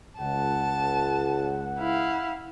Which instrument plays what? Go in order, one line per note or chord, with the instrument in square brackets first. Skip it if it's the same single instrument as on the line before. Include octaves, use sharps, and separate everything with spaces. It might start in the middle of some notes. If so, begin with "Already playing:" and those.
[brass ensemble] C#2 [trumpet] F#5 [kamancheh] A5
[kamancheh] E4 F5